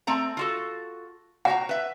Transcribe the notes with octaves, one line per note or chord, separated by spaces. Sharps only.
A3 C4 A#5
F4 F#4 A4
F#4 F#5 G5 A#5
B4 E5